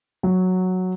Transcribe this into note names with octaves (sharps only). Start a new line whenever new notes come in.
F#3